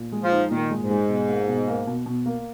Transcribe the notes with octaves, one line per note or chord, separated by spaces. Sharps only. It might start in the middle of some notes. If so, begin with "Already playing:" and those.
Already playing: A#2
G#3
F3
D#4
A#2 D#3
G#3
G#2
G#3
B2
A#3
B2
A#3
B2
B2
A#3